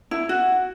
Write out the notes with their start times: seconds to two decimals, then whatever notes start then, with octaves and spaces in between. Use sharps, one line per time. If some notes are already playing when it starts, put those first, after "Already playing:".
0.11 E4
0.29 F#4